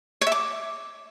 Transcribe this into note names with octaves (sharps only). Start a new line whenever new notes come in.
C#5
E5
D6